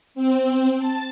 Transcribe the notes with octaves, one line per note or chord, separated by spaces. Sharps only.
C4
A5